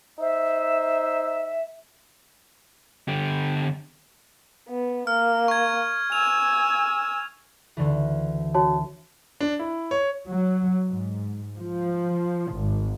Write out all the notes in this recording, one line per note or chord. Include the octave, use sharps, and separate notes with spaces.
D#4 C5 E5
D3 G4
B3
A#3 F6
C#6 G#6
G#5 E6 F7
D2 D3 E3
F#4 C#5 A5
D4
E4
C#5
F#3
G#2
F3
G#1